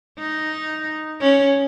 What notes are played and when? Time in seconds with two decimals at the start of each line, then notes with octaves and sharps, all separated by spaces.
0.19 D#4
1.21 C#4